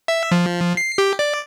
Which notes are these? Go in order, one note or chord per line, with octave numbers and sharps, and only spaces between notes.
E5
F3
C7
G4
D5